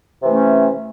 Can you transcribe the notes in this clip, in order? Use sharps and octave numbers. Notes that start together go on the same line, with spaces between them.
C3 E3 A3 C#4